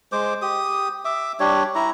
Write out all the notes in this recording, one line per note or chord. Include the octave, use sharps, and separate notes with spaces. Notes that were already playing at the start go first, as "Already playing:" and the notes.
G#3 C5 D6
G4 D#6
E5 D6
G3 D4 G4 C#5
E4 A#5